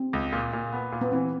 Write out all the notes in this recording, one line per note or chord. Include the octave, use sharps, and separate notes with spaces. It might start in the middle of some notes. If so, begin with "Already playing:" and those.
Already playing: C4
C#2
A#2
A#2
B3
A#2
B3
E3 C4